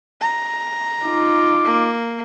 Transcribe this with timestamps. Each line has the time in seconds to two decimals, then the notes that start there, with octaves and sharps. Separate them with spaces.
0.21 A#5
1.04 D#4 F4 D6
1.65 A#3